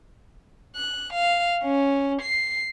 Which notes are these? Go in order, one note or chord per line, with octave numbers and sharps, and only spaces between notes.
F#6
F5
C#4
C7